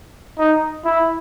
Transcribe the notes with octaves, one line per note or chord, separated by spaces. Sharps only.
D#4
E4